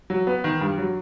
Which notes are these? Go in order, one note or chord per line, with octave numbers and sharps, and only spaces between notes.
F#3
B3
D#3
G2
F#3